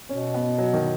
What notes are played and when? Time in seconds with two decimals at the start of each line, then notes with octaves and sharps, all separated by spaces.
0.09 B2 C#4
0.34 B3
0.58 F#3
0.73 D#3